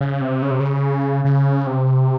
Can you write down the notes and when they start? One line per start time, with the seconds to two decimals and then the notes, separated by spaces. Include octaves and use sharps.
0.01 C#3
0.21 C3
0.42 C#3
0.51 C3
0.60 C#3
1.25 C#3
1.67 C3